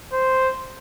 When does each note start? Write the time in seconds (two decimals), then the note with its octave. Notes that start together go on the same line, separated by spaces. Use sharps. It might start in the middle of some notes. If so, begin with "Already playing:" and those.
0.13 C5